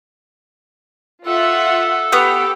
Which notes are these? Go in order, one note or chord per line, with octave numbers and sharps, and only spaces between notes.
F4 A4 E5 F#5
A3 B3 G4 F#5 G5